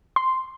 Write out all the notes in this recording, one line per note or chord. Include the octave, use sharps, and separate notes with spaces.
C6